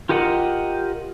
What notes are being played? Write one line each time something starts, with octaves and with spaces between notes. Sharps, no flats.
F4 G4 A#4 D#5 F#5